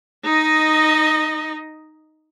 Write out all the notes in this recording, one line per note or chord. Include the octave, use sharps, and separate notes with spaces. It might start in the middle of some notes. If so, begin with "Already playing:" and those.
D#4 D#5